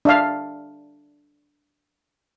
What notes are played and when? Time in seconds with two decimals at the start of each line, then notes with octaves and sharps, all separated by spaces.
0.05 D4 E5 F5